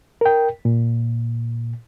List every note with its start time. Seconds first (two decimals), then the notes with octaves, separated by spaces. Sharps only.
0.21 A#4 G5
0.65 A#2